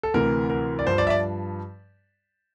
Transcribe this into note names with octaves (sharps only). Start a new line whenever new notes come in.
A4
D2 C3 E3 A#4
A#4
D5
G2 F3 C5
D5
E5
D5